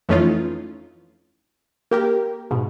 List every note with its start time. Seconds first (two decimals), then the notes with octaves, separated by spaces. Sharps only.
0.09 F2 E3 A3 C#4 D#4 F4
1.91 A#3 G4 A#4
2.51 G#2 B2